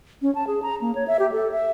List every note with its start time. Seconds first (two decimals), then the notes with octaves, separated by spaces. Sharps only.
0.22 C#4
0.35 A5
0.47 G#4
0.63 A#5
0.81 A#3
0.95 C#5
1.07 E5
1.19 G4
1.32 A4
1.52 E5